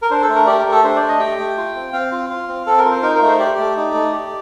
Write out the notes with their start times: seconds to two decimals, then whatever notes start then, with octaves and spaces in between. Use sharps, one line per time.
0.02 A#4
0.10 D4 C5
0.22 A4
0.29 A3
0.35 A#4
0.47 G4 D5
0.59 A#4
0.66 A3
0.72 A4
0.83 D4 C5
0.96 D5
1.02 A3
1.09 D#5
1.20 G4 G5
1.38 A3
1.57 F4
1.76 C4
1.93 C4 F5
2.12 F4
2.30 F4
2.49 C4
2.66 C4 A4
2.78 A#4
2.85 F4
2.91 C5
3.02 D#4 A#4
3.16 A#4
3.21 A3
3.28 C5
3.39 G4 D5
3.58 A3
3.77 D#4
3.94 A3
4.12 G4